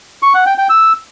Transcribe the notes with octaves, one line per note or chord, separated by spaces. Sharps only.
C#6
F#5
G5
G5
E6